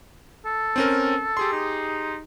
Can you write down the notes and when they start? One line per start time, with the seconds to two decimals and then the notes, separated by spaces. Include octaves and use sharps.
0.46 A4
0.76 C4 C#4 A#4
1.37 G4 G#4 C6
1.53 D#4